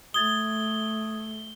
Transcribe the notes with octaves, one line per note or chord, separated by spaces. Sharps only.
A3 D#6 G#6 A6 G7